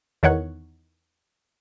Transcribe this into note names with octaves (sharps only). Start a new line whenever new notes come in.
E2 D#3 C#5 F#5